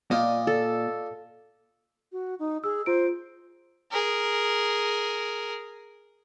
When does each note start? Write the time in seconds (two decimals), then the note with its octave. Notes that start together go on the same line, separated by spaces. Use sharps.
0.11 A#2 F4 D5 D#5
0.47 A4
2.12 F#4
2.39 D#4
2.64 G#4 E6
2.86 F4 C5 D7
3.91 G#4 A#4